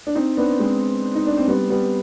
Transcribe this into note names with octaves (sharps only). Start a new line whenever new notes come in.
D4
C4 D#4
B3 D4
G#3 C4
D#4
D4
C4
G3 B3
G3 B3